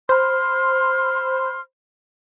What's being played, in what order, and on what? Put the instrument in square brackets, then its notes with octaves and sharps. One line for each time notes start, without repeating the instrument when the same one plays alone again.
[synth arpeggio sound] C5 B5 [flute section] C6 F6